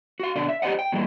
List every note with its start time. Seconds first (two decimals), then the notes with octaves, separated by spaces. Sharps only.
0.20 F#4 F5
0.36 B2 D3 D5
0.48 E5
0.62 G4 A4 C5 D5 D#5 F#5
0.79 G5
0.92 A#2 E3 G3 G#3 A#3